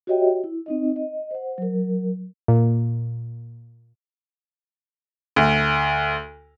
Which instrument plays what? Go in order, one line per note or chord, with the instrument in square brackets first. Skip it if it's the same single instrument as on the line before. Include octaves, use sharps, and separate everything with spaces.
[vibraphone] F#4 G4 C#5 D#5 E5 G5
E4
C4 D#4 D#5
D#5
C5 F#5
F#3 A#4
[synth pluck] A#2
[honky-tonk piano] D2